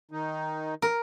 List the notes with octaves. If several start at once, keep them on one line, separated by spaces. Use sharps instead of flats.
D#3 D#4
A#4